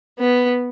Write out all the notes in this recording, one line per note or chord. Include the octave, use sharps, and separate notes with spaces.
B3